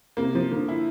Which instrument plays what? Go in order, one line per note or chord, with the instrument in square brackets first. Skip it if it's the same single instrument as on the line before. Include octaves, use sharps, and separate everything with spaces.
[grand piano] C3 [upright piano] A#3
[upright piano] F3
[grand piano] D3 [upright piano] A#3
[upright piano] E4